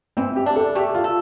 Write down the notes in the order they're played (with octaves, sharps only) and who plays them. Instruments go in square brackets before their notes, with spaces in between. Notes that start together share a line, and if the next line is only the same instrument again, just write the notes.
[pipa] E3 [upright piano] C4
[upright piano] G4
[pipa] D4
[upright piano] A4
[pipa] A3 [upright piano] G4
[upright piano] F4
[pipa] A4